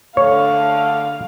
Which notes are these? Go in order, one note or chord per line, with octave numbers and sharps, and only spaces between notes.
D3 A3 C#5 F5